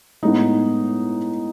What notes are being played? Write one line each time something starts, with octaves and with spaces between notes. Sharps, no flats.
A2 G#3 B3 D#4